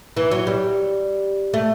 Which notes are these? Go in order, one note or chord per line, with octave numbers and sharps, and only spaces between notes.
E3
F#3
G3
A3